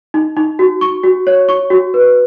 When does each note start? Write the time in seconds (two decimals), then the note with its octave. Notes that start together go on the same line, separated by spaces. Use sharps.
0.14 D#4
0.37 D#4
0.59 F#4
0.81 C#6
1.04 F#4
1.27 C#5
1.49 C#6
1.70 F#4
1.94 B4